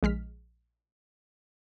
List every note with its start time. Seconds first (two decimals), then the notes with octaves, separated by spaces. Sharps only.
0.03 A#1 G#3 F6 B6